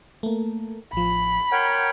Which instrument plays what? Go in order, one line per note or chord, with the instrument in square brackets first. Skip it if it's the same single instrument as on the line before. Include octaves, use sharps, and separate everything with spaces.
[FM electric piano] A3 A#3
[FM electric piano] A1 F3 [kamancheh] B5
[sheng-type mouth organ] A#4 C#5 G5 [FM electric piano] F#5 G6